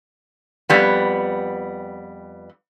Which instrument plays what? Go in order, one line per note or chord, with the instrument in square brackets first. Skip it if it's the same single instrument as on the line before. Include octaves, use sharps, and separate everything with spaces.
[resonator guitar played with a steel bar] F2 G3 B3